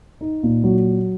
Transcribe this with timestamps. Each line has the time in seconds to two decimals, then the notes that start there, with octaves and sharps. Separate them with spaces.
0.21 D#4
0.43 A#2
0.64 F#3